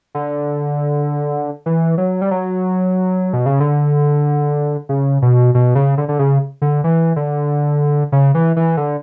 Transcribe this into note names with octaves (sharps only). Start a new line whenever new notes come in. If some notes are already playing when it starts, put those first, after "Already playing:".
D3
E3
F#3
G3
F#3
B2
C#3
D3
C#3
B2
B2
C#3
D3
D3
C#3
D3
E3
D3
C#3
E3
E3
D3